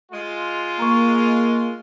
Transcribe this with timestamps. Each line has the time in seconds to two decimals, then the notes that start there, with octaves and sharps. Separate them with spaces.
0.11 G#3 F4
0.79 A#3 A#5 C6 C#6